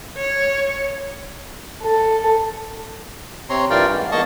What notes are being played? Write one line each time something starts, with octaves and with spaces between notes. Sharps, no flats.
C#5
A4
C3 C4 C#5 A#5 C6
G2 E3 F4 A#4 D5 G5
G#2
E2 A#3 D#5 A5 C#6 D#6